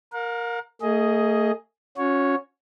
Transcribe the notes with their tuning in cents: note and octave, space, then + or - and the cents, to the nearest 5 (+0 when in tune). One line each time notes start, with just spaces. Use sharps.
A#4 +0 F5 +45
A3 +40 G#4 +0 D#5 +10
C#4 +0 F#4 -35 C#5 +0